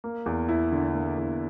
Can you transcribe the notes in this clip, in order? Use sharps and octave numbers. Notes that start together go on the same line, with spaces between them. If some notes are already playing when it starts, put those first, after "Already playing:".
A#3
E2
E4
D3
A#3
E2